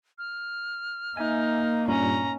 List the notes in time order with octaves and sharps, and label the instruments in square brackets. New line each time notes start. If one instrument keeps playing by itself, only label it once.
[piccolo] F6
[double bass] A#3 [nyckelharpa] D#4 [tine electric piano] E5 G#5
[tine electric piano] G2 A#2 G3 [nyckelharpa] C#4 [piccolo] A#5